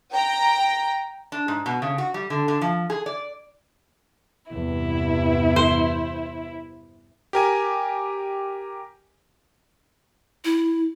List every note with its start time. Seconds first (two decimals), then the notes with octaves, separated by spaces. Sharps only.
0.12 G5 A#5
1.32 D4
1.48 G#2
1.66 B2
1.82 C#3
1.98 F#4
2.14 G3
2.30 D3
2.48 D3
2.61 F3
2.90 G#4
3.06 D5
4.52 E2 G2 C3 E4
5.56 C5
7.33 G4 A#4 G#5
10.44 E4